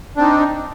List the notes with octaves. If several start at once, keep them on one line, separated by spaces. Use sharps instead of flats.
C4 D4 D#4